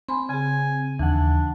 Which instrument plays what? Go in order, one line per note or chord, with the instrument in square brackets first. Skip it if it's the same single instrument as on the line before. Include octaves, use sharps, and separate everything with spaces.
[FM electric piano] C4 [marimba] G#5 B5 C6
[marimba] C#3 G#4 [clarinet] G#5
[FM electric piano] D#2 F#5 [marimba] E3 [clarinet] D4